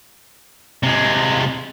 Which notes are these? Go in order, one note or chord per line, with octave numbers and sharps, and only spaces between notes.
C3 G#3